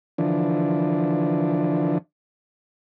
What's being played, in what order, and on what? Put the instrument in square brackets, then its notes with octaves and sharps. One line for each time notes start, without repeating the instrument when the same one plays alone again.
[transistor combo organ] D3 E3 F3 D4